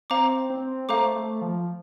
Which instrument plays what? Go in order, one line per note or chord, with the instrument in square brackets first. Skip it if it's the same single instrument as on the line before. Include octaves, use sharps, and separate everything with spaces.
[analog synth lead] C4 [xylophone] C5 F5 A#5 D6
[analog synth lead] C4
[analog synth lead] A3 [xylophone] C5 F5 A#5 D6
[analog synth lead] A3
F3